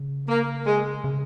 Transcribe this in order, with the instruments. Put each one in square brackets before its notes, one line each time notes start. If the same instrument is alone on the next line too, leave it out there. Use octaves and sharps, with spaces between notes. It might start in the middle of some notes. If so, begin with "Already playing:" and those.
Already playing: [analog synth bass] C#3
[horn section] A#3
G#3
[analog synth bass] C#3